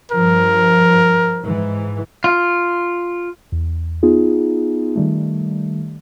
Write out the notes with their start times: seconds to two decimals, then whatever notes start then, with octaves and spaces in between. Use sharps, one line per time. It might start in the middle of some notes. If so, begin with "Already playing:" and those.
0.12 G2 F3 A#4
1.44 G#2 E3
2.24 F4
3.52 E2
4.03 B3 D#4 F4 G#4
4.96 D#3 G3 A3